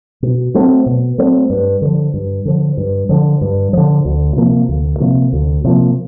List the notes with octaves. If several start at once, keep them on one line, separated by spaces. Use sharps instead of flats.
B2
F#3 A3 C4
B2
F#3 A3 C4
G2
D3 F3
G2
D3 F3
G2
D3 F3
G2
D3 F3
D2
C3 F3 A#3
D2
C3 F3 A#3
D2
C3 F3 A#3